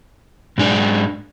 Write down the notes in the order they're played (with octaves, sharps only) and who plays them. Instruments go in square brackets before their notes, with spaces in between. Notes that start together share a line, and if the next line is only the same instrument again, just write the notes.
[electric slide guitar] G#2 G#3 D4